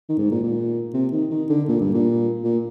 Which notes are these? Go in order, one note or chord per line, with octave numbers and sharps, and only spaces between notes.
D#3
G#2
A#2
A#2
C3
D#3
D#3
D3
A#2
G2
A#2
A#2